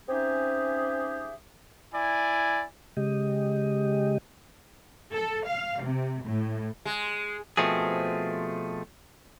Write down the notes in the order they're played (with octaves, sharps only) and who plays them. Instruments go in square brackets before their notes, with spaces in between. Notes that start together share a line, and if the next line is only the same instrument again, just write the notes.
[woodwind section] C4 C#4 D#4 G4 G#4 E5
[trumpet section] E4 D5 G#5
[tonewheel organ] C#3 G#3 G4 D#5
[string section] A4
F5
C3
A2
[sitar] G#3
[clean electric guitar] B2 F3 A3 C4 G#4